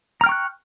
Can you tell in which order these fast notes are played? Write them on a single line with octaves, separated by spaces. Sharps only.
A#5 F6 G5 C#6 F#6